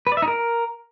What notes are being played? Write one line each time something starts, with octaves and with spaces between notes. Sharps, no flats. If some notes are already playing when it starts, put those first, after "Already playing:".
B4
D5
E5
D#4
A#4